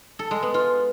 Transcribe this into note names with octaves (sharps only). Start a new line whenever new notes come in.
A4
G#3
B3
F4